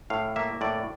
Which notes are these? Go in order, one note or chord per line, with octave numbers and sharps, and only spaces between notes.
A2 F5
A#3 E5
A2 D5